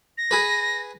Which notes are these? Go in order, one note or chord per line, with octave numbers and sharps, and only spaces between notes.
A#6
G#4 B4